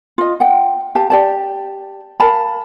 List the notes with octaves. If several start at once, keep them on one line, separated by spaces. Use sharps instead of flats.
F4 D#5
F#5 G5
G4 F5 A5
G4 D5 A5
A#4 F5 A5 B5